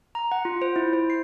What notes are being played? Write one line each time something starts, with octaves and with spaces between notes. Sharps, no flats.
A#5
F#5
F4
C5
E4
C5
C7